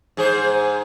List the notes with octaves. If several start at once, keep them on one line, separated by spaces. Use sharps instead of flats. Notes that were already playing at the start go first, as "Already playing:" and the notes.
G#2 G#4 C5